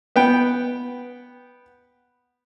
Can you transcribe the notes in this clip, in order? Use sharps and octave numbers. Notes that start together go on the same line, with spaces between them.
B3 G5